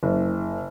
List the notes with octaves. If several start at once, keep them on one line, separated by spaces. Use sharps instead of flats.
F#1